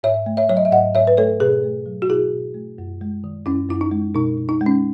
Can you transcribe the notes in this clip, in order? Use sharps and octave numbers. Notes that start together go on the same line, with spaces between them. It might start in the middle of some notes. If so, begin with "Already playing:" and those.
G#2 C#5 E5
A3
C#5 E5
F#3 C#5
D#5
E5
G#2 D#5 F#5
G#2 C#5 E5
B4
A3 A4 C#5
B2 G#4 B4
A3
F#3
F#4
B2 E4 G#4
B2
A3
F#2
G#3
D#3
F#2 C#4 E4
F#2 E4
D#4
G#3
B2 D#4
B2
D#4
G#3
C#4